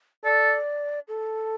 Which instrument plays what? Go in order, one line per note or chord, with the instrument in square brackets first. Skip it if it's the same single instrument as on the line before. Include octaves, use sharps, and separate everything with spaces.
[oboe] A4 [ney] D5
[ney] A4